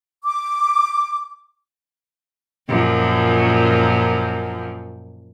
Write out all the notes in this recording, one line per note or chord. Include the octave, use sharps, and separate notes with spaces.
D6
F#2 A#2 F3